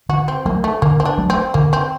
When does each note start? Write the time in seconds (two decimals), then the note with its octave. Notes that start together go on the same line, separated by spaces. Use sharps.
0.09 D3 F#4
0.28 C4
0.45 F#3 A3 A#3
0.64 A3
0.82 D3 A#3
1.00 C4
1.05 D4
1.18 F#3 A3
1.30 C4
1.54 D3 A#3
1.73 C4